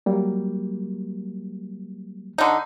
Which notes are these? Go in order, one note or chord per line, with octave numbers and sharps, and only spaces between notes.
F#3 G3 A#3
D3 D#4